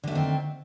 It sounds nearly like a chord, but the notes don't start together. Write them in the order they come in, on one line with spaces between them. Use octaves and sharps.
D3 A3 D#3 C4